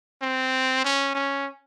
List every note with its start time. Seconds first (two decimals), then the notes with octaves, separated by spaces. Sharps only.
0.22 C4
0.84 C#4
1.15 C#4